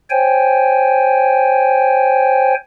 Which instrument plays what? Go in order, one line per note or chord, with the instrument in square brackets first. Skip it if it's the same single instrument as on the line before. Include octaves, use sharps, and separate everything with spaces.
[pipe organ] C5 C#5 G5 G#5